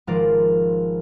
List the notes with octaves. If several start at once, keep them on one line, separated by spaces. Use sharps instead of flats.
G#1 F3 G#3 F4 A#4 D5